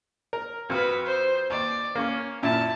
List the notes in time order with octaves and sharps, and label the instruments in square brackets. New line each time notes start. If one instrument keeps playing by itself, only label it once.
[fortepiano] A#4
[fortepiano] F2 F6 [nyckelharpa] F#4 B4
[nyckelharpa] C5
[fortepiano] D#2 [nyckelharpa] D5
[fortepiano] A#3 C#6 [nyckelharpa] C#4
[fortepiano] F#2 A#2 E4 [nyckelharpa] A5